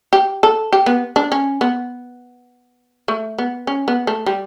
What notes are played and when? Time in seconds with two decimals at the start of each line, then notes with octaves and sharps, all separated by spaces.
0.13 G4
0.43 A4
0.73 G4
0.86 B3
1.16 D4
1.32 C#4
1.61 B3
3.08 A3
3.38 B3
3.67 C#4
3.88 B3
4.07 A3
4.26 G3